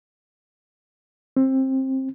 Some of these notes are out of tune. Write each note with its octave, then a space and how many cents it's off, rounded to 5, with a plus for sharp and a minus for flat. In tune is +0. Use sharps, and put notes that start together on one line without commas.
C4 +20